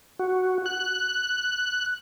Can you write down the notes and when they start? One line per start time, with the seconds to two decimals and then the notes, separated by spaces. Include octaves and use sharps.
0.19 F#4
0.66 F#6